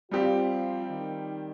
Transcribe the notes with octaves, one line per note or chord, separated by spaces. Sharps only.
F3 G3 C4 F4 G4
D#3 D#4